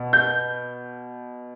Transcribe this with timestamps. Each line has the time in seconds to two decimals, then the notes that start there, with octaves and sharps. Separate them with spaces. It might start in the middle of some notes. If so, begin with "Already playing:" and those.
Already playing: B2
0.13 G6